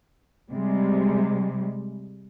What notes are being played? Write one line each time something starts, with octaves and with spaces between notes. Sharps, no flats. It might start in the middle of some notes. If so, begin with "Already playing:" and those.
C3 G3 G#3